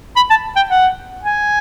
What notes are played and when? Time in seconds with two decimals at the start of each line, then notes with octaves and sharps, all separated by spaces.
0.16 B5
0.30 A5
0.56 G5
0.71 F#5
1.23 G#5